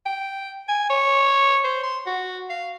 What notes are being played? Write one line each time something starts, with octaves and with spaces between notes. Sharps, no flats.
G5
G#5
C#5
C5
C6
F#4
F5